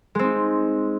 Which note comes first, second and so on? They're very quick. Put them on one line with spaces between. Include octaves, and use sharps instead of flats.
G#3 C4 D#4